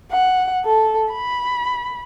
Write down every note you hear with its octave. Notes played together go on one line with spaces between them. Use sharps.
F#5
A4
B5